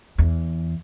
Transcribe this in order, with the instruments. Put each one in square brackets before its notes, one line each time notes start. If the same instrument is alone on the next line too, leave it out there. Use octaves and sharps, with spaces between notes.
[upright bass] E2